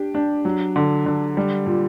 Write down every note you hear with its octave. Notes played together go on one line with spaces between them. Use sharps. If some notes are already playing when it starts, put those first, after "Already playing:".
Already playing: D4 G4
D4
F#3
D3
D3
G3
A#2